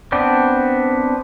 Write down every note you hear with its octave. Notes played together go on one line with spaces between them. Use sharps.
B3 C4 D4 D5